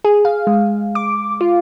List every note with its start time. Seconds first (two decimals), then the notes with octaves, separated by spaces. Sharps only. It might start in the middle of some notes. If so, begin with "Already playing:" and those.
0.05 G#4
0.25 F5
0.47 G#3
0.95 D6
1.41 F4